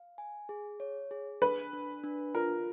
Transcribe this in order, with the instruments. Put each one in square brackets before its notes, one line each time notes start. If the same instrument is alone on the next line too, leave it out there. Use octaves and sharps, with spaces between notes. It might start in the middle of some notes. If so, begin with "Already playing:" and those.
Already playing: [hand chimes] F5
G#5
G#4
C#5
G#4
[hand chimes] D4 [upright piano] B4
[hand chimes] D4
D4
[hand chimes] F4 [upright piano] A#4